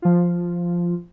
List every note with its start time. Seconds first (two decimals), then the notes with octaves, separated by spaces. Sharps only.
0.02 F3 F4